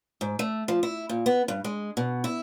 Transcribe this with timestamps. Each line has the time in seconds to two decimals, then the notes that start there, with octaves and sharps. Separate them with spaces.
0.21 G#2
0.39 A3
0.68 F3
0.83 E4
1.09 A#2
1.26 B3
1.48 G2
1.64 G#3
1.97 B2
2.24 E4